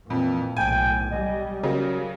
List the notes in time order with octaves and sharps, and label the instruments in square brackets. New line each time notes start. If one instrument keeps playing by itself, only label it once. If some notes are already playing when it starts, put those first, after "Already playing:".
[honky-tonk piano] F2 [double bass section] A#2 E3
[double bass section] B1 A2 [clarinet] G5 [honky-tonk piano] G#5
[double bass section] G3 [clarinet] D#5
[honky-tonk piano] C#3 F#3 [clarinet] A#4